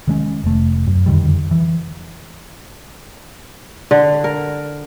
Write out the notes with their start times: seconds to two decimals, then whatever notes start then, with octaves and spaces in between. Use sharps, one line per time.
0.07 D#3 G#3 C#4
0.44 F1 A3
0.87 F#2
1.06 F2 D3 D#3 G3
1.51 E3
3.91 D3
4.24 A#4